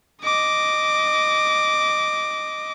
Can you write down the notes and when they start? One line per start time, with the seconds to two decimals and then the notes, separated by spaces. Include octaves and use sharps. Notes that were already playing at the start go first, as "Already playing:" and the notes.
0.23 D#5 D6